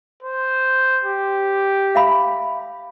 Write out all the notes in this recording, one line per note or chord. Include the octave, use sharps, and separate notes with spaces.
C5
G4
E5 F5 B5